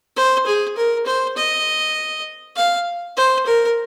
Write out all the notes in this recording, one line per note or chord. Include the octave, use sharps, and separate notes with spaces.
C5
G#4
A#4
C5
D#5
F5
C5
A#4